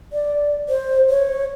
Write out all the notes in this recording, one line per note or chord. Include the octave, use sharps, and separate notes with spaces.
D5
C5
C#5